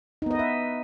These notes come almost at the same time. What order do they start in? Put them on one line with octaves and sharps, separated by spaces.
D#4 B3 D#5 B4 E5